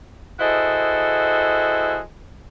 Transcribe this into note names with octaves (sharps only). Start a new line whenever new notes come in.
E4 F#4 G#4 A4 C5 D#5